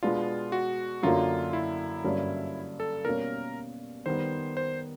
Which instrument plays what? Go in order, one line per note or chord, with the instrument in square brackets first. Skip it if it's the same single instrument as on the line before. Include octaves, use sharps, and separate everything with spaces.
[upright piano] B2 G#3 B3 D4 [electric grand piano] F4
[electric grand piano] F#4
[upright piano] F#2 D3 F#3 A#3 [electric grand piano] F4
[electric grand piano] E4
[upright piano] G2 D3 F#3 A#3 C#4
[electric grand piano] A4
[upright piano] B2 G3 A#3 C#4 [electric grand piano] A#4
[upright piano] D#3 G3 B3 [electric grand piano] C5
[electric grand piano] C5